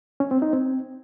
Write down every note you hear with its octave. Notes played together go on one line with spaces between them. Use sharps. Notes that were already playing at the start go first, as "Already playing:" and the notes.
C#4
C4
D#4
C4